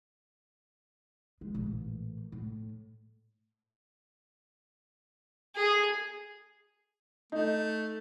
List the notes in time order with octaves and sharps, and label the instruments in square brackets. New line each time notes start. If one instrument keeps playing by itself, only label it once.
[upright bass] G#3
A1 A#2
A2
[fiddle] G#4
[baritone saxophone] A3 [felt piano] D#4